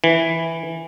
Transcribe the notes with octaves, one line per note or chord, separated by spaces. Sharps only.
E3